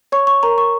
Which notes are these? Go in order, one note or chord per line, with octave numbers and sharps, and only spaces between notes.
C#5 C#6
C#6
A#4 A#5
C#6